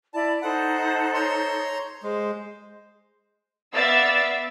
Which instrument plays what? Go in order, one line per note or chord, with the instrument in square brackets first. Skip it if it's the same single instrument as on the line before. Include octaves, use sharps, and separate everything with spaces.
[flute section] E4 D5 B5 [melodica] A5
[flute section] D#4 A4 C5 [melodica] F#5
[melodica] C#5 A#5 C6
[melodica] G#3 [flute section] C5
[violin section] B3 D5 E5 F5 E6 A6